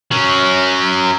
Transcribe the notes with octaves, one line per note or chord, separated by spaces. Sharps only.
F#3 C#4